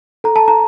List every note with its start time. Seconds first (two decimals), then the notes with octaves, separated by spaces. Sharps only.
0.24 A4 A#5
0.36 A5
0.48 A#5